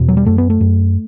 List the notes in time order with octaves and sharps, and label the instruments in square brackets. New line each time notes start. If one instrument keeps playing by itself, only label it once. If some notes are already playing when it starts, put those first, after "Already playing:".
Already playing: [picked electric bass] E2 B2
F#3
G3
F#2 A3
B3
A3
F#2